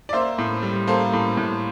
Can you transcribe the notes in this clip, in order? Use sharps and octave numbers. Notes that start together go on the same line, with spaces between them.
D5
A#3 C5 E5
A2
G3
A#3 A4 C5
A2
A2